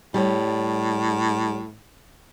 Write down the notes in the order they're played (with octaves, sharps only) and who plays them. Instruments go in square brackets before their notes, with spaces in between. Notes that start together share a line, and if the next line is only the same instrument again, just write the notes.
[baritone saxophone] A2 [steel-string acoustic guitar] G3 C#5